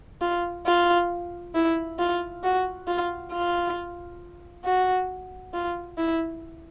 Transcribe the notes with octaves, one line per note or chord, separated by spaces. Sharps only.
F4
F4
E4
F4
F#4
F4
F4
F#4
F4
E4